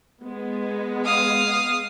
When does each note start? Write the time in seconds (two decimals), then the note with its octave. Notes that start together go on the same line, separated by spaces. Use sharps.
0.24 G#3 B3
1.05 F5 D#6